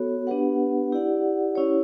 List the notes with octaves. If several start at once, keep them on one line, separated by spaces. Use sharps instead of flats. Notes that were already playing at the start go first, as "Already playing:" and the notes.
Already playing: B3 F#4 A4 C#5
B3 D4 G4 B4 F#5
E4 G4 D5 F#5
C#4 E4 G4 C#5